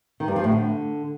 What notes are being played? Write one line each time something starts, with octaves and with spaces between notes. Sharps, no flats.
D#3
G2
F3
A2
D3